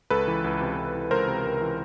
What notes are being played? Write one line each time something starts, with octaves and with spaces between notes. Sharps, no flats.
C#2 A4 B4
E3
C#2
C3
C#2
E3
C#2 A#4 C5
C3
C#2
E3